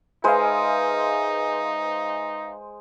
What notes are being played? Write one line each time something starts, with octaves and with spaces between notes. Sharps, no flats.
G#3 D#4 B4 C5 E5 F5 G#5